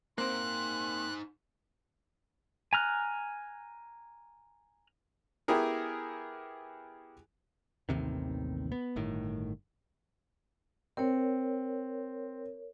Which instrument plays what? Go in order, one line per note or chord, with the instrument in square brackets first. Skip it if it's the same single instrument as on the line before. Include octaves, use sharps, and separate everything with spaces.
[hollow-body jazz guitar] A#3 C4 [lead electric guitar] D#4 C5 [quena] C6 [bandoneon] F#6
[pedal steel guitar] G#5 A#5 F6 F#6
[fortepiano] B3 E4 G4 G#4 A#4
[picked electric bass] A1 D#2 C3 D#3
B3
G1 A2 D#3
[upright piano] C4 [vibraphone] A#4 C#5